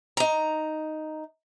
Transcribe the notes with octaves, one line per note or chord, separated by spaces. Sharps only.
D#4 A#5